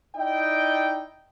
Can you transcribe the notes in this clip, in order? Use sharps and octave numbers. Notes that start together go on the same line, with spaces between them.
D#4 E4 D5 D#5 G5